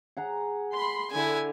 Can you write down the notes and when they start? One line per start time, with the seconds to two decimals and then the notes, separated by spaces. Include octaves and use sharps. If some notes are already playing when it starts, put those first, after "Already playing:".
0.17 G#4 F#5 A#5
0.75 B5 C6
1.11 D3 E4 G#5